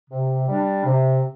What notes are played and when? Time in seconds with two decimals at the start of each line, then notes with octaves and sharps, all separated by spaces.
0.10 C3
0.47 G3 D4
0.84 C3